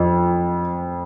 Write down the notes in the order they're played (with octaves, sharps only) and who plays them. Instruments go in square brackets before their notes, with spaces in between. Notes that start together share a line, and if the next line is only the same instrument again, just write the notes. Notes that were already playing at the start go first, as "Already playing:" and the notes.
Already playing: [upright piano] F2